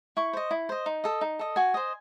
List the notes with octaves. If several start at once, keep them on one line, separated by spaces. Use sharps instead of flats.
E4 C#6
C5 D#5
E4
C5 D#5
D#4
A4 D#5
D#4
A4 D#5
F#4 G#5
C5 D#5